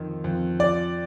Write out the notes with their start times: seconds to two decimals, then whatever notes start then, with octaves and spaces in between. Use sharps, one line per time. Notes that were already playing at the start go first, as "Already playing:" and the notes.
Already playing: F2 D#3
0.24 F2
0.59 F3 D5